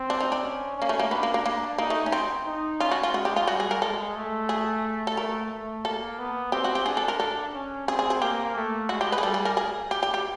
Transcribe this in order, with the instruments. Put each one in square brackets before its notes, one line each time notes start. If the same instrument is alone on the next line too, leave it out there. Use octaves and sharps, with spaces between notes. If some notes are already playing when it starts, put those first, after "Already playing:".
Already playing: [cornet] C4
[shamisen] D4
D#4
D4
[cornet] C#4
[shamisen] A#3 [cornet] C#4
[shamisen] A3
A#3
[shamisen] B3 [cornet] D4
[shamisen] A#3
A#3
A#3
[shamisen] A#3 [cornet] D#4
[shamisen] A3
C#4
C4
[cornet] D#4
[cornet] C#4 [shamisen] F4
[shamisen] F#4
F4
[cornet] G#3 [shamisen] F#4
[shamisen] G4
F4
[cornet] G3 [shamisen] F#4
[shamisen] G#4
A#4
[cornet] G#3 [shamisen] A4
[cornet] A3
[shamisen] G#4
A4
[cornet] A3 [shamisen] A#4
[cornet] A3
[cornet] A#3 [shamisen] A4
[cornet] B3
[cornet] C4 [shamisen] G4
[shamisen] F#4
G4
[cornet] D4 [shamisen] G#4
[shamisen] A4
A#4
A4
[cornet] C#4
[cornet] C4 [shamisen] G#4
[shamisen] G#4
G#4
[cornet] A#3 [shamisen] G4
[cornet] A3
[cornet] G#3 [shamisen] F#4
[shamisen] G4
B4
G#4
[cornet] G3 [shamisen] A4
[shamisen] G#4
A#4
G#4
G4
G4
G4